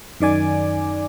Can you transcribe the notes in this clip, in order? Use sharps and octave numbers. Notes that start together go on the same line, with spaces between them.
F#2 D#3 D5 G#5 D6